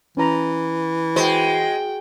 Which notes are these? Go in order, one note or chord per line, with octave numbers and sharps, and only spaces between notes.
E3 C#4 A#5
G#3 F#4 C5 G5